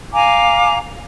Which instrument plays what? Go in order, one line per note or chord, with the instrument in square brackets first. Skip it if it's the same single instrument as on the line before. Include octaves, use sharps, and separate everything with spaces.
[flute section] F5 G#5 A#5 D6